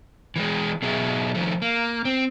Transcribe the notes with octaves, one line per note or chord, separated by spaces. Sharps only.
E3 G3 G#3
B2 F#3 G#4 E5
D#3 F3 A3
A#3
C4